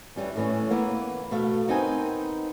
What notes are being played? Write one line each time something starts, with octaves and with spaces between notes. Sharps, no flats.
E3 G3 C#4
A2 E3 C#4
E3 A#3 B3 E4
B2 A3 F5
B3 C4 D#4 A#4 G5 G#5